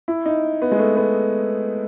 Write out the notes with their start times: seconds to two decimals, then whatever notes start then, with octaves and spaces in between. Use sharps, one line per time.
0.08 E4
0.26 D#4
0.62 B3
0.72 G#3
0.79 A3
0.97 B3